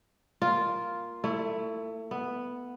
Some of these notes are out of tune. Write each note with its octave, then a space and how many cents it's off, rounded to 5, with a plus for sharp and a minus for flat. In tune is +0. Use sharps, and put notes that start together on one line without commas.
A#3 +0 F4 +0
A3 +30 E4 +0
B3 +0 E5 +5